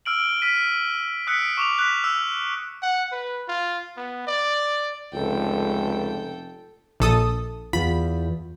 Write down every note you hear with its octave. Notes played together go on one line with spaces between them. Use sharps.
E6 F6 D7 F#7
F6 A#6 B6 D#7
D#6 E6 F#6 B6 C#7 D7
C#6 D6 F7
F#6 B6
E6
F#5
B4
F4
B3
D5
F1 C#2 A4 G5
A#1 A4 D#6
E2 F4 B5